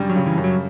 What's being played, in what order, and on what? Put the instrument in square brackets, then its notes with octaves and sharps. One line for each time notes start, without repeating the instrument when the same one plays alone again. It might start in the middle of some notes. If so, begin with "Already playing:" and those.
Already playing: [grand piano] F#2 C#3 G3 D4
[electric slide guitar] F#3
[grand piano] C#3
[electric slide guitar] E3
[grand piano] F#2
[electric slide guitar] F#3